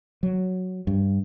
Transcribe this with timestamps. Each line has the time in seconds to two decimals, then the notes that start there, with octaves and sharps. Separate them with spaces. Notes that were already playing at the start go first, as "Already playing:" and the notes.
0.23 F#3
0.87 G2